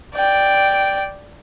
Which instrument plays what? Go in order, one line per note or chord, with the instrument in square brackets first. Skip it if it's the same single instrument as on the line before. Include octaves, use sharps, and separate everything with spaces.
[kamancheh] D5 G5